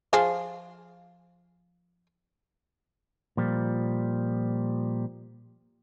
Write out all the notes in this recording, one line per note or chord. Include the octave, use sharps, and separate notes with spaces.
F3 F4 G#4
A#2 F3 G3